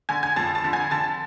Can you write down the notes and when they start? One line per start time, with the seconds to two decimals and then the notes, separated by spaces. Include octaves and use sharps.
0.09 D3 G#5 G#6
0.23 G#5 G#6
0.36 F2 A5 A6
0.55 A5 A6
0.64 D3
0.73 G#5 G#6
0.91 D3 A5 A6